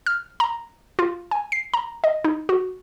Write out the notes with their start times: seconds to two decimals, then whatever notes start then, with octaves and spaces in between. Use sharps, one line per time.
0.06 F6
0.40 A#5
0.99 F4
1.31 G#5
1.52 C7
1.74 A#5
2.04 D#5
2.24 D#4
2.49 F#4